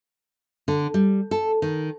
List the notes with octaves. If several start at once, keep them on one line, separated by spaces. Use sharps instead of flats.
D3
G3
A4
D#3